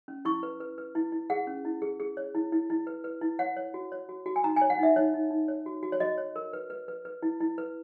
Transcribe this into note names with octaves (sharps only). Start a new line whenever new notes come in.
C#4
E4 C#6
B4
B4
B4
E4
E4
G#4 F#5
C#4
E4
G#4
G#4
C#5
E4
E4
E4
B4
B4
E4
C#5 F#5
C#5
F#4
C#5
F#4
F#4
G#5
D#4 A#5
G#5
C#5
F#5
D#4 E5
D#4 C#5
D#4
D#4
C#5
F#4
F#4
C#5
F#4 D#5
C#5
A#4
B4
B4
B4
B4
E4
E4
B4